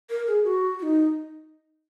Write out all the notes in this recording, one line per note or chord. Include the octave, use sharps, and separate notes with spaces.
A#4
G#4
F#4
F#4
D#4